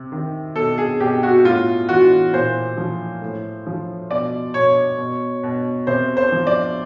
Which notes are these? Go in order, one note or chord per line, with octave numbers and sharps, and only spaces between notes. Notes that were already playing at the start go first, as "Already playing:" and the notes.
Already playing: C3
D#3
B2 A4
G#4
B2 G4
F#4
A2 F4
E3 F#4
A#2 C5
F3
A2
F3
B2 D5
B2 C#5
B2
B2
C3 C5
C5
F3
D5